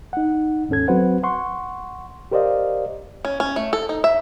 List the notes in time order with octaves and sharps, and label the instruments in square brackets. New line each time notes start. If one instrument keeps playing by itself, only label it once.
[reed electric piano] D#4 F#5
D#2 G#2 C#4 A4 G#6
F#3 C4 F#4 B4 C5 F#5
F#5 C6 C#6
G4 A#4 C5 D5 D#5 F5
[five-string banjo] C#4
C#4
A3
A4
D#4
E5